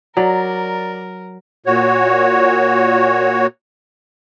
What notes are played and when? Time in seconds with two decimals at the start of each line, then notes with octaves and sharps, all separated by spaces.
0.17 F#3 A#4 D5 A#5
1.66 A#2 F#4 C#5